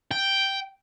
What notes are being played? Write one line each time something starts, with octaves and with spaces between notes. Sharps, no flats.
G5